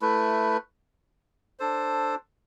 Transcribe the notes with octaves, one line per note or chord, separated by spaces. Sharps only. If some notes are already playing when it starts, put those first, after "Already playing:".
A3 E4 B4
D4 A4 C5